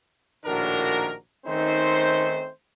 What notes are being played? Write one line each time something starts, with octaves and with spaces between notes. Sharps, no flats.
A#1 A2 D#3 D4 F#4 A#4
D#3 A3 C4 C#4 D#4 C5